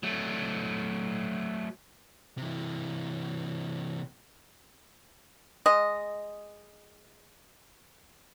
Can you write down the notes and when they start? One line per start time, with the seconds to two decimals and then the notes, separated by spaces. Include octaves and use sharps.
0.03 F#3 A3
2.38 C3 E3
5.66 G#3 D#5